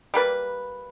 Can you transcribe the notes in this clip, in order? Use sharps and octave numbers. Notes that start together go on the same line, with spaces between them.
G3 A#3 B4 D5